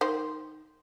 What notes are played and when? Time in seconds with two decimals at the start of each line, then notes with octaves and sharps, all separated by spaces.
0.01 D#3 C5